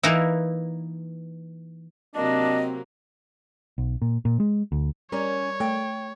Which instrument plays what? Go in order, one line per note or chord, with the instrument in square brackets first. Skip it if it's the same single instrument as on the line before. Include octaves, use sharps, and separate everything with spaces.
[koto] E3 A#3 D#4 E4
[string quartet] C3 F#3 A#3 [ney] C4 [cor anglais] D4 [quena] D#5
[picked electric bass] B1
A#2
A#2
G#3
D2
[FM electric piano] G3 A#4 D5 [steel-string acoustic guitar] C#4 [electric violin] C#5
[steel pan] A3 [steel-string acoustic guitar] G5